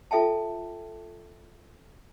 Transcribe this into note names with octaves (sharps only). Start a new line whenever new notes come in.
F4 A4 E5 G5 A5